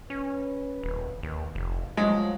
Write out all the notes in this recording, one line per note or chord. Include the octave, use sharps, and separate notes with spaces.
C#4 B4
D#1
D#2
F1
F3 F#3 G#3